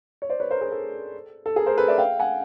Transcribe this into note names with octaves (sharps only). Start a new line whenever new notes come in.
C#5
C5 D5
B4 C#5
A#4 C5
G#4 A#4
A4
A4
G#4 A#4
A#4 C5
A4 B4
D5 E5
F5 G5
F#5 G#5